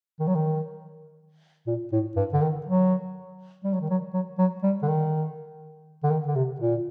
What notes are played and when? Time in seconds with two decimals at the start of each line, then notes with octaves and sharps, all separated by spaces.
0.19 D#3
0.27 F#3
0.35 D#3
1.67 A#2
1.92 A2
2.16 G2
2.33 D3
2.41 D#3
2.66 F#3
3.64 G3
3.73 F#3
3.81 D#3
3.90 F#3
4.14 F#3
4.38 F#3
4.63 G3
4.83 D3
4.88 D#3
6.03 D3
6.10 D#3
6.27 D3
6.36 C3
6.60 A#2